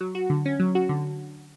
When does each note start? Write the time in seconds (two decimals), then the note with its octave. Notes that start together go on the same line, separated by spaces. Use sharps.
0.01 F#3
0.15 F#4
0.30 D3
0.46 C#4
0.60 F#3
0.75 F#4
0.89 D3